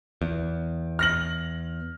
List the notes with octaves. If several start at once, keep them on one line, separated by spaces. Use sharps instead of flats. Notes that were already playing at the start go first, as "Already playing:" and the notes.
E2
F6 A#6 F#7